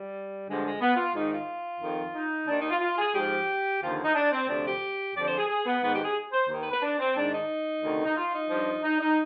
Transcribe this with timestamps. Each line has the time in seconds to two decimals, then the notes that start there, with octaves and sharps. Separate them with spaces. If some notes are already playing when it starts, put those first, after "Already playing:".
Already playing: G3
0.48 G2 D3 F3 G#3
0.64 G#3
0.81 B3
0.97 F4
1.14 G#2 D#3 D#4
1.31 F4
1.80 F2 D#3
2.14 D#4
2.48 D#2 D#3 D4
2.59 D#4
2.71 F4
2.81 F4
2.98 G#4
3.15 G#2 F3 G4
3.81 D#2 D3 F3 F4
4.05 D#4
4.15 D4
4.32 C4
4.48 D2 C3 F3 D4
4.65 G4
5.15 F2 D3 F3 D5
5.26 C5
5.38 G#4
5.48 G#4
5.66 B3
5.82 G#2 D#3 B3
5.93 G4
6.04 G#4
6.33 C5
6.49 D#2 D#3
6.60 B4
6.71 B4
6.82 D4
6.99 C4
7.17 G#2 D#3 D4
7.33 D#4
7.83 D2 C3 D#3
8.06 D#4
8.17 F4
8.33 D#4
8.51 G2 F3
8.83 D#4
9.01 D#4